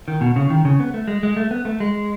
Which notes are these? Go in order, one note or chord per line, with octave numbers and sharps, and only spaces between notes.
D#3
B2
C#3
D#3
C#3
B3
A3
G#3
G#3
A3
B3
A3
G#3